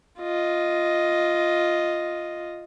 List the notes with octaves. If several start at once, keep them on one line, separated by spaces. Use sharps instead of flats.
F4 D#5